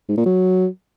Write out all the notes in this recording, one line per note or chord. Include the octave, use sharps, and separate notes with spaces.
G#2
A#2
F#3